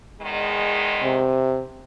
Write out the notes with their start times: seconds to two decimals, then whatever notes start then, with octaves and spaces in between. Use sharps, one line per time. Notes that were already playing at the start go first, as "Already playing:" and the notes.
0.21 E2 D#3 G#3
1.03 C3